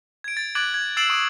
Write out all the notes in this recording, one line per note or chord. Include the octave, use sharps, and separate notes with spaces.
G#6 D7
A6
D6 F#6 G#6 A6 D7 F#7
G#6
E6 A6 C7 D7 E7 F#7
C#6 D#6 D7 E7